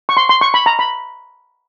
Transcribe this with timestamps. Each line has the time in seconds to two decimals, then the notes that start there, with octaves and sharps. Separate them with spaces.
0.09 C#6
0.17 C6
0.29 C6
0.41 C#6
0.54 B5
0.66 A#5
0.79 B5